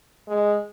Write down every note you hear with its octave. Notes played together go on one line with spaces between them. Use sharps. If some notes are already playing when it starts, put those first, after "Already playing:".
G#3